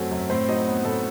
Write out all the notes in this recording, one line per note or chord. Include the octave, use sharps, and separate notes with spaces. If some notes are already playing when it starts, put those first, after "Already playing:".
Already playing: F#2 F#3 A3 C4
F#2
A2 C4 C5
F#3 D#4 D#5
B3
A2 A3 A4